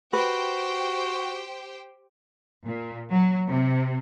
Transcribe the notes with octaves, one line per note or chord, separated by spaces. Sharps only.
F#4 G4 B4 C5 G5
A#2
F#3
C3